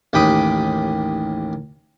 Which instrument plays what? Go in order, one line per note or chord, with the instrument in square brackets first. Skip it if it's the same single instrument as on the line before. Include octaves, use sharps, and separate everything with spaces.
[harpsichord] A1 D#2 G4 G5 B5 D#6